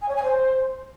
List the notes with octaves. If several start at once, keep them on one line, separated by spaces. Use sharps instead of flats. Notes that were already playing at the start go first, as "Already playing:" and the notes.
G#5
C#5
G#5
C5